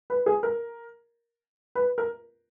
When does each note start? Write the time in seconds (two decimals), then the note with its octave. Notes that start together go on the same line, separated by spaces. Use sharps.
0.10 B4
0.26 G#4
0.43 A#4
1.75 B4
1.98 A#4